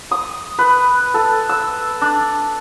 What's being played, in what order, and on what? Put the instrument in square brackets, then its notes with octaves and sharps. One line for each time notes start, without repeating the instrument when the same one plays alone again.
[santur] D#6
B4
A4
E6
D4